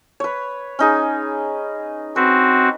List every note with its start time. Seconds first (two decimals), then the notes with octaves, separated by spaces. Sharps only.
0.20 B4 C#5
0.79 C#4 D#4 G#4
2.16 C4 F#4 B4